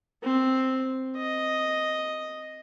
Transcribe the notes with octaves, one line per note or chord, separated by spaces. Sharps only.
C4
D#5